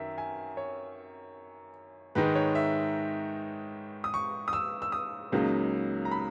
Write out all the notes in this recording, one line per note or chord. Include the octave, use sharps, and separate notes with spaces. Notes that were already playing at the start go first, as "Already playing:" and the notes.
Already playing: F#2 D#3 A#4 E5
G#5
C#5
G#2 D#3 G#3 D#4 B4
C#5
E5
D#6
C#6
D#6
E6
E6
D#6
C#2 C#3 F#3 A#3 D#4
A#5
B5